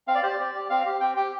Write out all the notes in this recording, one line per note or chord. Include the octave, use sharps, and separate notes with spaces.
C4 F5
D5
G4 C5
D5
C4
G4
C4 F5
G4
C4 G5
G4 G5